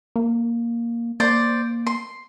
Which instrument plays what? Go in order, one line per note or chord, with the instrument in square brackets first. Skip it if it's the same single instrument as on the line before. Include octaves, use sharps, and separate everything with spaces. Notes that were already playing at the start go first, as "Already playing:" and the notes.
[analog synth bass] A#3
[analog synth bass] A#3 [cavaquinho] C5 D5
[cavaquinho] C6